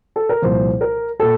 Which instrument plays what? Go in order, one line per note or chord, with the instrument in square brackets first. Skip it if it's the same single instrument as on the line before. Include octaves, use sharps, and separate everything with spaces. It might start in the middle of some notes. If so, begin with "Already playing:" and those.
[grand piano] A4
A#4
C2 A#2 F3 C5
A#4
A#2 A4